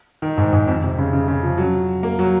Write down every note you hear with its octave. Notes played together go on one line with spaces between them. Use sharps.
D#3
G#2
G#2
F2
C3
C#3
C#3
C#3
F3
F#3
A#3
F#3